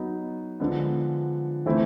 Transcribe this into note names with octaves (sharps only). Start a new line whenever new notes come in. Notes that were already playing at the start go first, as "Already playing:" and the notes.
Already playing: F#3 B3 D#4
D3 F3 G#3 B3
E3 A3 C4 E4